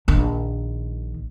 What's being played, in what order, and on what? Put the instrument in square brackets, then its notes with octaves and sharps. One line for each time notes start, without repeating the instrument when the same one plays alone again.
[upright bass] A#1 D#3